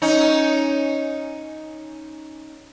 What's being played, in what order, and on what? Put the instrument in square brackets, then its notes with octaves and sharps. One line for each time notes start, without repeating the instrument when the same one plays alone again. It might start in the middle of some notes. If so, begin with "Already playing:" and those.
[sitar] C#4 D#4